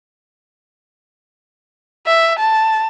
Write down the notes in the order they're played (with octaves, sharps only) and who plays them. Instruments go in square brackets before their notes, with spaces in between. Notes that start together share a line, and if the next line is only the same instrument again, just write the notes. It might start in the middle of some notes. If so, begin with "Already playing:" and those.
[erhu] E5
A5